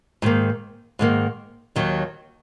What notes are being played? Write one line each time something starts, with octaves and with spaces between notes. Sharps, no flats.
G#2 D#3 A#3
G#2 D#3 A#3
D#2 D#3 F#3